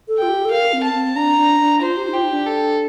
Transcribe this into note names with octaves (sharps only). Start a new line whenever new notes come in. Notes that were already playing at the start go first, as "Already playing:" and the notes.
A4
F4 G5
G4
A4
A#4 F5
C4
A5
C4
D4 A#5
D4
D4
F4 C5
G4
D#4
F4 G4
D#4
D4
A4